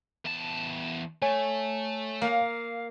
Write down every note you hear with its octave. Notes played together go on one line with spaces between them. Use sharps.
E2 A5
A3 C#5 G#5
A#3 F5